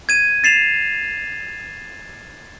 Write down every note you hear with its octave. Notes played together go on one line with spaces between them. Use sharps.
G#6 D#7
A6 C7 E7 F7